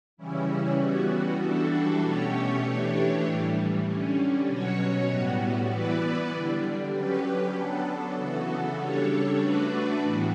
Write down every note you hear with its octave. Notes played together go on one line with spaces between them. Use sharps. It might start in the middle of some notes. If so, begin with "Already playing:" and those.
C#3 E3 G3 C#4 E4
E3 G3 B3 F#4
E3 G3 D4 F#4 A4
B2 A3 C#4 G4 C#5
E3 A3 D4 G4 C#5
A2 E3 G3
D3 G3 C#4
B2 F#3 C#4 F#4 C#5
A2 G3 B3 F#4
E3 B3 E4 B4 D5
D3 G3 D4
D3 F#3 C#4 G4 B4
F#3 B3 D4 A4
C#3 E3 B3 F#4 A4
C#3 G3 D4 A4 C#5
A3 D4 F#4 B4 D5
A2 E3 G3 B3 F#4